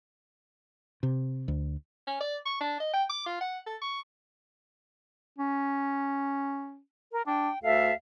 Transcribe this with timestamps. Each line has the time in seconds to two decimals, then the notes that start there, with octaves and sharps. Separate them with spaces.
1.03 C3
1.48 D2
2.07 C#4
2.21 D5
2.46 C#6
2.60 D4
2.80 D#5
2.93 G5
3.09 D6
3.26 F4
3.41 F#5
3.66 A4
3.82 C#6
5.38 C#4
7.12 A#4
7.27 D4 G5
7.63 D2 A4 E5 F5